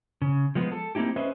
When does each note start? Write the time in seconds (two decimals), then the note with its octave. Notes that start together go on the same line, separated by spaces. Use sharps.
0.22 C#3
0.55 F3 G#3 B3
0.72 A4
0.95 A#3 C4 D#4 E4 G4
1.16 C#4 G#4 B4 C5 D#5 E5